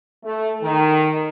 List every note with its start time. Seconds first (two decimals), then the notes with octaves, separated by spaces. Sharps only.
0.24 A3
0.62 D#3